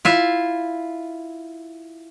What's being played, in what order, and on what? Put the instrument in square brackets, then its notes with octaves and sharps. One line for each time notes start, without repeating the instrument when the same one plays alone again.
[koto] E4 F4 E5